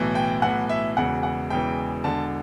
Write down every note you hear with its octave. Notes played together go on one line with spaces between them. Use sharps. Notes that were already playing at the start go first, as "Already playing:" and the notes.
Already playing: B1 A2 E3
G5
B1 A2 E3 F#5
E5
E1 E2 C#3 E3 F#5
F#5
E1 E2 C#3 E3 G5
E1 E2 D3 A5